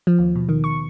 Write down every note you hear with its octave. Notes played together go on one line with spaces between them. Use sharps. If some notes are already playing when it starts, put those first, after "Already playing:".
F3
D#2
B2
D#3
C#6